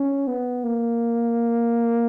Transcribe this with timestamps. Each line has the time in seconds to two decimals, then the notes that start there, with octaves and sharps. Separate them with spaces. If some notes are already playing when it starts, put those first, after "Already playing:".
Already playing: C#4
0.28 B3
0.64 A#3